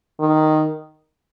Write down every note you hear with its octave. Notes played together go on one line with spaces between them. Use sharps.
D#3